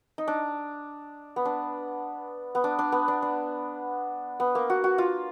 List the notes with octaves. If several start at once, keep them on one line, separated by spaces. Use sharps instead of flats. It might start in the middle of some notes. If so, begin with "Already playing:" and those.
D#4
D4
B3
D4
B3
D4
D4
B3
D4
D4
B3
A#3
F#4
F#4
F4